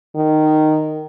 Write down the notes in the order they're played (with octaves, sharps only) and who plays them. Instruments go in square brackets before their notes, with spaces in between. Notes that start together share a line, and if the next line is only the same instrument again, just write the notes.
[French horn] D#3